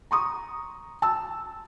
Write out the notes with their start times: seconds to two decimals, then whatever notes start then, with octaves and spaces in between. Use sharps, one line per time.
0.11 A#5 C#6 D#6
1.02 A5 E6